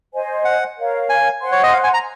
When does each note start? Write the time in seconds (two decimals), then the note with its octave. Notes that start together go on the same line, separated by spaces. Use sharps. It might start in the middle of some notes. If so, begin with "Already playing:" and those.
0.13 C5 D#5 G#5
0.45 F#5
0.77 A#4 C#5 F5
1.09 G#5
1.41 C5 F#5 C6
1.52 C#5
1.63 D#5
1.73 F5
1.84 G#5
1.94 A#5